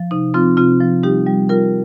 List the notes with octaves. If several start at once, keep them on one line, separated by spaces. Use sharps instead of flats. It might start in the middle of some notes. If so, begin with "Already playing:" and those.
Already playing: F3
C3 D#4
F3 C4 F4
C3 C4 F4
F3
G3 D#4 G4
G3
G3 F4 A#4